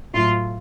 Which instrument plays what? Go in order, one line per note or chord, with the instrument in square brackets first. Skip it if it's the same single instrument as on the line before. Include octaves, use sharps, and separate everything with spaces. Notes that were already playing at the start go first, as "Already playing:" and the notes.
[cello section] A2 F#3 A3 F4